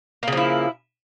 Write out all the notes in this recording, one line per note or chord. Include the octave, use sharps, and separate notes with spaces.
C#3 F3 A#3 E4